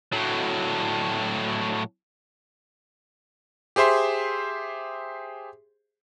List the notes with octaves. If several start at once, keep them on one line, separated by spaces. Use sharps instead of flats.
A2 F#3
G4 G#4 C5 E5 C6